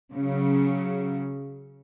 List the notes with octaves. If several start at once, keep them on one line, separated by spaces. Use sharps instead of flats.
C#3 F#3